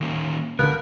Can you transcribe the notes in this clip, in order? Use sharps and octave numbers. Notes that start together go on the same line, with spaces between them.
D#3 A#3 C#4
C#2 D3 A#4 B4